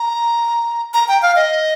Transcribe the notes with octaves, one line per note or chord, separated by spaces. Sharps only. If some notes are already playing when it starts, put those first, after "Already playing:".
Already playing: A#5
A#5
G5
F5
D#5